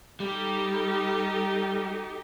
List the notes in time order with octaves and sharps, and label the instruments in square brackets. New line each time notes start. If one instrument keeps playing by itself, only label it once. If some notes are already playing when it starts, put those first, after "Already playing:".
[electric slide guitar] G3 [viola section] D#4 G4 A4